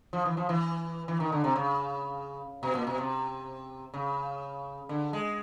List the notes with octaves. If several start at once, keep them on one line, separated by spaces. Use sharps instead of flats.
F3
E3
F3
E3
E3
D#3
D3
C3
C#3
B2
A#2
B2
C3
C#3
D3
G#3